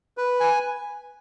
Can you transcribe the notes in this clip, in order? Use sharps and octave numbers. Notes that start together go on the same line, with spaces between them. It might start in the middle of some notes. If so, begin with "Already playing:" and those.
B4
G#5